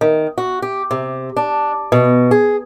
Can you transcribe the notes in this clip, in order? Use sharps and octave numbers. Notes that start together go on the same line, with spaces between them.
D#3
F#4
G4
C3
D4
B2
G#4